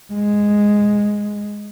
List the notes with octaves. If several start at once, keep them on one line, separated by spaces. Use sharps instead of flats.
G#3